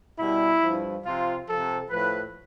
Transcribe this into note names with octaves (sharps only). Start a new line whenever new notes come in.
B2 G3 E4
G2 F3
C3 F3 F4
C3 F3 A4
A2 F3 B4